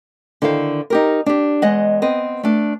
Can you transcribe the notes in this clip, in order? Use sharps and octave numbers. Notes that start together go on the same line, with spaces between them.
D3 D#3 E4 C5 F5
D#4 G4 A#4
D4 G4
E2 G#3 D#5 F#5
B3 C4 D#5
A3 D4